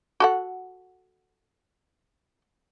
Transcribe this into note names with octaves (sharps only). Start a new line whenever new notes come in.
F#4 A4 F#5